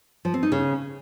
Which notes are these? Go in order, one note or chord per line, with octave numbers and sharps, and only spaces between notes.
F3
C4
D#4
C#3